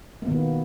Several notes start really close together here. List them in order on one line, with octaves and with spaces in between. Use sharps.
A#3 B3 D#3 B2